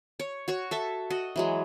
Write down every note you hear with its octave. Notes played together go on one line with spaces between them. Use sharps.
C#5
F#4 C#5 C#6
A4 E5 A5
F#4 D#5
E3 F#3 G#3